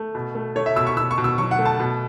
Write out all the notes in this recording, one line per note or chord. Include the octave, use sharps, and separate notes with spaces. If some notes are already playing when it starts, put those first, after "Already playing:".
Already playing: A3
B2
A3
A3 C#5
E5
B2 E6
C#6
B2 E6
C#6
B2
E6
F#3 C#6
F#5
A3
A5
B2